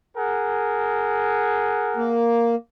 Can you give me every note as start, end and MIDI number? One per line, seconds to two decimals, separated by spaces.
0.17 2.22 68
0.17 2.22 70
0.17 2.22 78
1.96 2.55 58